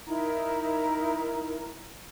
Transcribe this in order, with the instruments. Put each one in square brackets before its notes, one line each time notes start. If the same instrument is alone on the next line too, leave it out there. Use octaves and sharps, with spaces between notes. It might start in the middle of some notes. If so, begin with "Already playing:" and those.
[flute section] D#4 E4 A#4 A#5